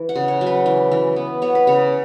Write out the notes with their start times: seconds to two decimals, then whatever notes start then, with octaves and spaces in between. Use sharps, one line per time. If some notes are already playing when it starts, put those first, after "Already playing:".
Already playing: E3
0.09 F#5
0.15 C#3
0.28 C#5
0.41 F#3
0.46 B4
0.66 E3
0.92 E3
1.16 B3
1.42 B3 C#5
1.55 B4
1.67 C#3 C#5